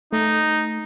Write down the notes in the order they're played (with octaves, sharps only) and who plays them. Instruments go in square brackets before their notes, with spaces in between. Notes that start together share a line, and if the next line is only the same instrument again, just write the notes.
[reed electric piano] A3 [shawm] D#4